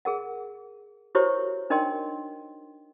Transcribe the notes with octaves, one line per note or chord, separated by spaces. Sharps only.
G#4 A#4 F#5
E4 F#4 G4 A#4 C5 C#5
D4 D#4 A#4 D#5 G5 C6